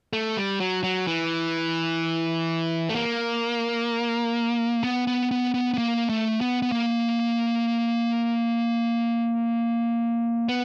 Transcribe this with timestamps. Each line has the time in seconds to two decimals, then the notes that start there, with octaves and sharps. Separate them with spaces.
0.13 A3
0.37 G3
0.60 F#3
0.84 F#3
1.07 E3
2.89 A3
2.95 A#3
4.84 B3
5.07 B3
5.31 B3
5.54 B3
5.74 B3
5.78 A#3
6.09 A3
6.41 B3
6.62 B3
6.72 A#3
10.49 B3